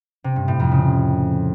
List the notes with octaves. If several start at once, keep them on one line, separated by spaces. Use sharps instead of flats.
C3
G2
A2
F2
C#3